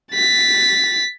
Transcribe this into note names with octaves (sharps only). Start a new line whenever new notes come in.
A6 B6